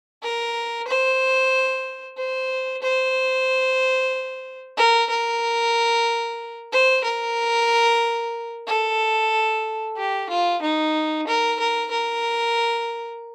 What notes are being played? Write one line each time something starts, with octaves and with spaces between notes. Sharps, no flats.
A#4
C5
C5
C5
A#4
A#4
C5
A#4
A4
G4
F4
D#4
A#4
A#4
A#4